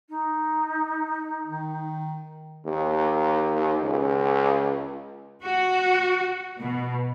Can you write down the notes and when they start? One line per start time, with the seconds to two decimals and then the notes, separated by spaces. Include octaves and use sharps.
0.09 D#4
1.46 D#3
2.66 D#2
3.83 C#2
5.44 F#4
6.59 B2